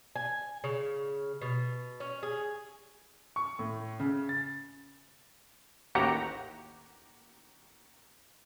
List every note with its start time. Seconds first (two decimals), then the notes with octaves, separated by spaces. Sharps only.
0.16 G#5
0.64 C#3
1.42 B2
2.00 C#4
2.23 G#4
3.36 C#6
3.59 A2
4.00 C#3
4.29 A6
5.95 A1 D#2 F#4 G4 A#5 C#7